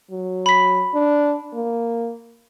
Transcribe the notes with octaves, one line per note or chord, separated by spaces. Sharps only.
F#3
B5 B6
D4
A#3